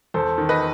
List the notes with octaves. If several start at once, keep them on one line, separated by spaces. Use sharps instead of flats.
E2 A4 C5
D#3
B4 D#5